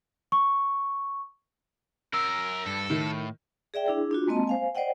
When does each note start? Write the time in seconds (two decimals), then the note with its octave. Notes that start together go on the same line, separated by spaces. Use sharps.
0.32 C#6
2.14 F#2 A#4 E6
2.66 G2 A4
2.90 A2 D#3
3.74 G#4 D5 E5 G5
3.86 D4 E4 G#4
4.11 D4 F4 F#4
4.27 G#3 A#3 C4 D#5 A5
4.47 C5 F5 G#5
4.75 C5 D5 D#5 F#5 G5